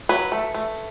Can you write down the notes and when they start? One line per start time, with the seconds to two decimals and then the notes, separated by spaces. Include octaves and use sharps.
0.09 F#3 B4
0.32 A3
0.54 A3